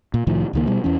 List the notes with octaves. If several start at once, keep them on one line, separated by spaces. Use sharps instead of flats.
A#2
C2 A2 D#3 F3
C#2 D#3 A#3
B2 G3
E2 E3 C#4